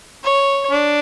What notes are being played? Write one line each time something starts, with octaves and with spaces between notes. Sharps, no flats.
C#5
D4